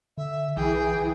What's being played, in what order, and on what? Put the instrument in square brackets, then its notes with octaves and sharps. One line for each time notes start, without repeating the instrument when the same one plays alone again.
[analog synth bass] D3 [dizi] E5
[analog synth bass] B1 [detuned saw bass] E3 [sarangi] G#4 [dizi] G5